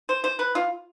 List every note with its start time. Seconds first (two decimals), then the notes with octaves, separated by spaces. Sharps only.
0.09 C5
0.24 C5
0.39 B4
0.55 F4